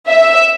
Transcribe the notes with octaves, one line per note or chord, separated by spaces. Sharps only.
E5